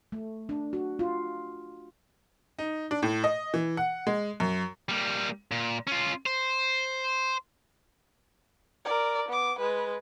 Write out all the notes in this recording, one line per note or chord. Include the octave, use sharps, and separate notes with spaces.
A3
D4
F#4
F4
D#4
D4
A2
D#5
E3
F#5
G#3
F#2
G3 A#3
A#2
C#4 F4
C5
A#4 D5
B3 D6
G#3 B4